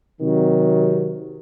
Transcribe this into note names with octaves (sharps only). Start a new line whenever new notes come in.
C3 D#3 F#3